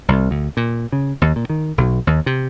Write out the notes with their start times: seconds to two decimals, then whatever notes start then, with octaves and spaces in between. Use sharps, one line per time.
0.08 C2
0.31 D2
0.57 A#2
0.92 C#3
1.22 D#2
1.36 A#2
1.50 D#3
1.78 B1
2.07 D#2
2.26 C3